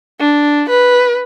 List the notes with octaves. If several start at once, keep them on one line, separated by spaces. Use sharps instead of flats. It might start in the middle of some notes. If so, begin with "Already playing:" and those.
D4
B4